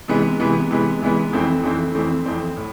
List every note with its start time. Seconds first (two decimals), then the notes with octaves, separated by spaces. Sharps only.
0.08 C3 E3 G#3 B3
0.40 C3 E3 G#3 B3
0.71 C3 E3 G#3 B3
1.01 C3 E3 G#3 B3
1.33 F2 E3 A3 C4
1.63 F2 E3 A3 C4
1.95 F2 E3 A3 C4
2.26 F2 E3 A3 C4
2.57 A2